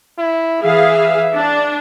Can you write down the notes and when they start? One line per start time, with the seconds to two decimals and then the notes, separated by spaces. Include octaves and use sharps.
0.19 E4
0.63 E3 G#4 E5 F5
1.36 D4